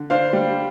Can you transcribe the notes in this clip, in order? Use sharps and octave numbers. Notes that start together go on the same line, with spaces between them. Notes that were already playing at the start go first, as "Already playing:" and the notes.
Already playing: D3
D4 C5 F5
G3